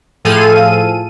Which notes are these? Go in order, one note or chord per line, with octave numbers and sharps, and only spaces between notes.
A2 F3 G#4 A4 F5 D#7